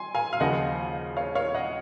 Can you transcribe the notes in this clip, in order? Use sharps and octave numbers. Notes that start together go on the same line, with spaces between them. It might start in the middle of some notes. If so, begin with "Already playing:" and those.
Already playing: G#5 C6
F5 G#5
F5
D#2 C#3 F3 D#5 F#5
C#5 F5
C#5 F5
D#5 F#5